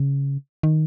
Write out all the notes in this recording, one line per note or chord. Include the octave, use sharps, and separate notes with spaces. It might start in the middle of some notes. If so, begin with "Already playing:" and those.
Already playing: C#3
D#3